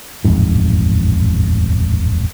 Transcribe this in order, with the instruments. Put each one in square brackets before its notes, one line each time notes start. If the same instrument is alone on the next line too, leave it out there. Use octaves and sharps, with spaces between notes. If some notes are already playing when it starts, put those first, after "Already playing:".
[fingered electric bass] D#1 A1 F2 G#2